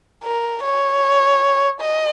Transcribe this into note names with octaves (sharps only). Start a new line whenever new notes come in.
A#4
C#5
D#5